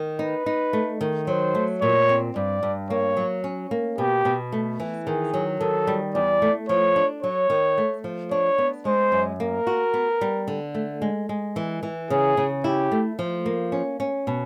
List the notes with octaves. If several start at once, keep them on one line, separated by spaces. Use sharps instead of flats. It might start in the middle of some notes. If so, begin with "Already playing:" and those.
Already playing: D#3
D#4 B4
D#4
A3
D#3
F#3 C5
A3
A#2 C#5
C4
G2 D5
G2
A#3 C#5
F#3
C#4
A#3
B2 G4
B2
A3
E3
D#3 G#4
F#3
D#3 A4
G3
E2 D5
A3
F3 C#5
D4
F#3 C#5
D#3
A3
F3
D4 C#5
B3
G#3 C5
F#2
A#3 A#4
F#4
B3
G3
D3
A3
G#3
G#3
E3
E3
C#3 G#4
C#3
E4 G4
A3
F3
A#3
C#4
C#4
B2